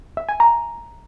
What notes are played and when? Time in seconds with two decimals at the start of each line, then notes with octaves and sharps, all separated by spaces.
0.17 E5
0.29 G#5
0.40 A#5